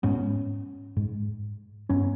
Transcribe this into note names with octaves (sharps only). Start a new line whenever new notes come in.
G#2 B3 C#4
G#2
G2 B3 C#4